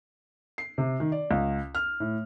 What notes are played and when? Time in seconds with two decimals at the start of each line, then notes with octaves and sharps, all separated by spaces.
0.58 C7
0.78 C3
1.00 D#3
1.12 D5
1.31 C#2
1.75 F6
2.00 A2